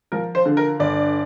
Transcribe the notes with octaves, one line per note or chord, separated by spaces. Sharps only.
F3 A#4
C5
D3
A#4
G1 D5